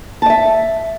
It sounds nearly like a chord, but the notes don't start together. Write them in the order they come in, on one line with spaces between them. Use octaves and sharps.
A5 D#5 E5